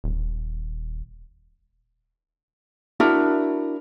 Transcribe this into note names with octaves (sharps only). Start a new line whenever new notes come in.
D#1
D4 E4 F#4 A#4